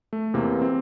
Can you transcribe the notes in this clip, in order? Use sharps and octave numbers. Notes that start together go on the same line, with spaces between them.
A3
E2 C3 E3 A#3
C4